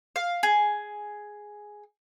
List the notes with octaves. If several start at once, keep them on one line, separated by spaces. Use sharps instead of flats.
F5
G#4